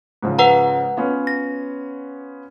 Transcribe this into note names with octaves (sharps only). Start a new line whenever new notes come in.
G#2 C#3 F3
B4 F#5 A#5
B3 C#4 F4
A#6